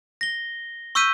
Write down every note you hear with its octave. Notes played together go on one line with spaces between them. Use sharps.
A#6 G7
C#6 E6 F6 G6 B6 D#7